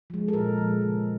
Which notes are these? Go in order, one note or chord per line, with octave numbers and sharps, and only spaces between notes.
F3 G#3
A4
A#2 A#4
F3 G#3
C#3